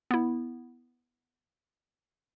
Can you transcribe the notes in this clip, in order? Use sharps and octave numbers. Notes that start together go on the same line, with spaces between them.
B3 E4